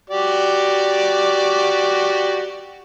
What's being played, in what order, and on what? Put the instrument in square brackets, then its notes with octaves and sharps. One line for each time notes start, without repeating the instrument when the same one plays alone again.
[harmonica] F#4 G4 D5